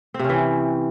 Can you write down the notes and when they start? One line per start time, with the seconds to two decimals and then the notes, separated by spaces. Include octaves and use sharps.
0.14 C4
0.19 C3
0.24 C#4
0.29 E3